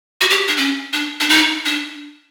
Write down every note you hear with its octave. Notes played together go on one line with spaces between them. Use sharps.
F#4
G4
D4
C#4
D4
D4
D#4
D4